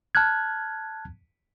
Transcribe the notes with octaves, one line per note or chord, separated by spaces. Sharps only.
A5 F6 F#6 G#6